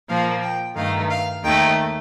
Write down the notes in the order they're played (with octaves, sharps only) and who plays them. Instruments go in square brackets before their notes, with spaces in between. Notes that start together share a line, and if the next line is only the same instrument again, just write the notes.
[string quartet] A#2 F3 A#3 F5
G5
G2 D#3 A3 F5
F5
D#2 D#3 A3 G5